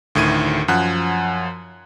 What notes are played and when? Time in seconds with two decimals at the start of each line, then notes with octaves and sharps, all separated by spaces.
0.15 D2 A2 D#3 G#6 D#7
0.68 F#2 F3 F#5 F#6